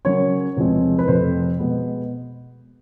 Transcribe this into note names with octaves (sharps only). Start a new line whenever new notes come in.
C#3 F#3 A#3 C#4 C#5
E2 C3 F3 G#3 C4
B4
F2 C3 F3 A3 C4 C5
B2 G#3 B3